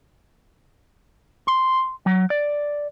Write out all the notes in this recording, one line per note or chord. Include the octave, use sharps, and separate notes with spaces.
C6
F#3
D5